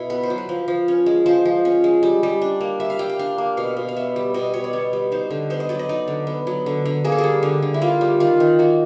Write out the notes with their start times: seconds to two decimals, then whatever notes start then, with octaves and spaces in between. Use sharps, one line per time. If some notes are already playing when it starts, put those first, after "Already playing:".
Already playing: B2 E4
0.10 B3 B4
0.23 C5
0.30 F#3
0.38 B4
0.49 F3
0.68 F3
0.88 C#4
1.06 G#3
1.26 F3 C5
1.46 F3
1.65 C#4
1.84 G#3
2.03 G3
2.23 G3
2.42 D4
2.61 A#3
2.80 G3 E5
2.90 F5
2.99 G3 G5
3.09 G5
3.19 D4 F5
3.38 A#3
3.57 B2 F5
3.77 B2
3.88 F5
3.96 B3 E5
4.16 G3
4.34 B2 D#5
4.54 B2 C#5
4.64 D5
4.73 B3 C#5
4.93 G3
5.12 D#4 C5
5.31 D3
5.50 B3 C5
5.60 D#5
5.69 F#3 D5
5.79 D#5
5.89 D#4 D5
6.08 D3
6.27 B3
6.47 F#3
6.66 D3
6.85 D3
7.04 A#3 G#4
7.12 A4
7.18 G#4
7.24 G3
7.43 D3
7.62 D3
7.74 E4
7.82 A#3 F4
8.01 G3
8.20 D#3 F4
8.40 D#3
8.59 A#3 F#4